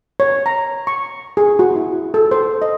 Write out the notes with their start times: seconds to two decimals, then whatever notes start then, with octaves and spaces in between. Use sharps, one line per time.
0.20 C#5
0.46 A#5
0.87 C#6
1.37 G#4
1.59 F#4
1.76 E4
2.14 A4
2.31 C5
2.62 D#5